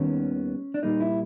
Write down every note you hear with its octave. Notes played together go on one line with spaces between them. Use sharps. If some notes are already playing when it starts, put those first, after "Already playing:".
Already playing: D#2 D#3 G3 B3 C#4
D4
A#2 G3 A#3 D#4
E4